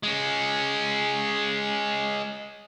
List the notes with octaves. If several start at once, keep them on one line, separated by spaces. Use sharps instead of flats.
G#3 C#4